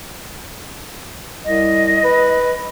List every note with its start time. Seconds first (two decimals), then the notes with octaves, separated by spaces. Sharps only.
1.45 C2 D#5
2.04 B4